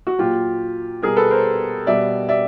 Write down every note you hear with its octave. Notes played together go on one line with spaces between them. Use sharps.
F#4
A#2 F#3 F4 G4
B2 G3 G#4 A#4
A4 B4
A#4 C5
B2 G3 D5 E5
D5 E5